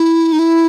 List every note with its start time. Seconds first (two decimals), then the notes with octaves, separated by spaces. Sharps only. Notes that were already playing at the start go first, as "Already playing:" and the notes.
Already playing: E4
0.32 D#4
0.39 E4